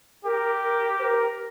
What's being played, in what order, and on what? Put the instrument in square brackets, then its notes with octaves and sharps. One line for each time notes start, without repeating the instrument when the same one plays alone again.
[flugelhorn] G4 [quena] A#4
[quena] A#4
C5
A#4